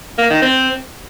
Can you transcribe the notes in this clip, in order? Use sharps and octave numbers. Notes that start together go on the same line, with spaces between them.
A#3
D#3
C4